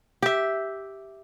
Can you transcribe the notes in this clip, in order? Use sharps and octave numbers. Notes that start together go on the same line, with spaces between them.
G4 E5